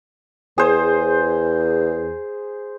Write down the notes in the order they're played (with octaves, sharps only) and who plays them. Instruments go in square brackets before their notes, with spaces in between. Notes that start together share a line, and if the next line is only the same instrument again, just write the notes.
[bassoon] E2 [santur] G#4 C5